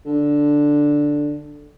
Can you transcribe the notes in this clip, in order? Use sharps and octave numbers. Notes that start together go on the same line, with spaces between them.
D3